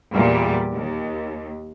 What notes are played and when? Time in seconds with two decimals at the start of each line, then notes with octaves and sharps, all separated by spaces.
0.13 E2 A#2 G3
0.74 D#2